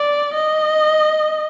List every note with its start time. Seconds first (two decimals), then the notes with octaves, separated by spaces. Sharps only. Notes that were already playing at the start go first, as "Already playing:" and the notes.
Already playing: D5
0.34 D#5